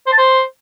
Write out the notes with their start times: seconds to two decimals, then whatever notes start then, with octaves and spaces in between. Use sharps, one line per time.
0.07 C5
0.13 A5
0.18 C5